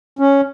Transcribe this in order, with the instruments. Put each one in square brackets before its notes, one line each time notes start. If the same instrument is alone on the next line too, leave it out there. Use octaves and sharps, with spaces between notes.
[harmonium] C#4